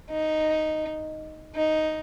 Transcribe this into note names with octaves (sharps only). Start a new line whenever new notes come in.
D#4
D#4